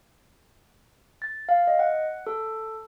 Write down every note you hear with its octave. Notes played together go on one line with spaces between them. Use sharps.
A6
F5
D#5
F#5
A4